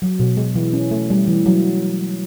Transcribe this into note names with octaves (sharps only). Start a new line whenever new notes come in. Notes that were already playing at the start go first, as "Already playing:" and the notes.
F#3
B2
G#3
E3
C#4
A3
G3
E3
F#3